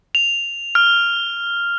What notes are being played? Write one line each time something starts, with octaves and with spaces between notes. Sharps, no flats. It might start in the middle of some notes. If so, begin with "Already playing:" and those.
F7
F6